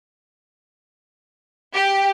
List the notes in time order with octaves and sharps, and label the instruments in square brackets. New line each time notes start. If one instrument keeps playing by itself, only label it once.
[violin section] G4